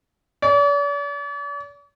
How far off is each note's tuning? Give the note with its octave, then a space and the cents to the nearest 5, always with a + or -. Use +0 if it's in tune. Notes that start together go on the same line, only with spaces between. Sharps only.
D5 -45